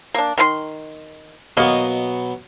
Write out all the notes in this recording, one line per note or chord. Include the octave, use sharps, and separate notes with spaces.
A#3 D4
D#3 F4 C6
B2 F#3 A#3 B3 D#5